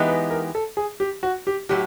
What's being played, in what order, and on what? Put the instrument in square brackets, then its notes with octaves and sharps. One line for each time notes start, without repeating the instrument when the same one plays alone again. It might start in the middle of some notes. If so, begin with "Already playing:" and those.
Already playing: [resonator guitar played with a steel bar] E3 G#3 B3 D#4 G4
[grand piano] B4
A#4
A4
G#4
G4
F#4
G4
[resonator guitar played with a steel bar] A2 F#3 [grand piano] G4